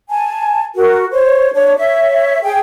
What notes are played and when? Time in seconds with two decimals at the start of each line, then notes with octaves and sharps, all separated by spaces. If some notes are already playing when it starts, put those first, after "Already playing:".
0.10 G#5 A5
0.76 F#4 A#4
1.12 C5 C#5
1.54 D4 C#5
1.78 C#5 E5
2.43 G#4 G5